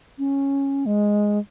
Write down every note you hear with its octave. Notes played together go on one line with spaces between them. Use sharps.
C#4
G#3